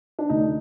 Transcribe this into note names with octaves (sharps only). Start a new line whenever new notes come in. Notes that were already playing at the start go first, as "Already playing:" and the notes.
D4
D2 D#4